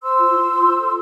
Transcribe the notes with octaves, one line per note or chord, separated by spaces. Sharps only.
C5 C6 E6
F4
F4
C5
F4
A4